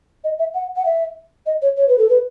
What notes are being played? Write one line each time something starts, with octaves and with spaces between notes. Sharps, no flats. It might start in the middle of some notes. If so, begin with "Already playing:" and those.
D#5
E5
F#5
F#5
E5
D#5
C#5
C#5
B4
A4
B4